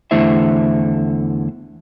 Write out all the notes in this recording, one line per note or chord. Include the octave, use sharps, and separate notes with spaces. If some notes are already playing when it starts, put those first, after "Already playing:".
E2 D3 A3 E4 C5 E5